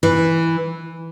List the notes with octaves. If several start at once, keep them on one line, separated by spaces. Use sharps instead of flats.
E3